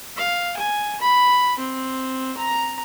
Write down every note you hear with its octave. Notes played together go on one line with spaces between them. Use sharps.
F5
G#5
B5
C4
A#5